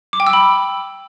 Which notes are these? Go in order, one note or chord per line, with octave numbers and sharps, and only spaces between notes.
D6
G5
E6
B5